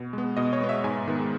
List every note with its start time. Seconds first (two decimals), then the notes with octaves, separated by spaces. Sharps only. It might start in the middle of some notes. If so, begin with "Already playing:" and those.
Already playing: B2
0.13 G#3 B3
0.37 B2 D#5
0.53 C#5
0.60 G#3 B3
0.69 E5
0.84 G#2 G#5
1.07 D#3 G#3 B3